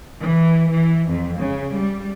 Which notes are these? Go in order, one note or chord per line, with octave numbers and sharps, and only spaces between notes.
E3
E3
F2
C#3
G3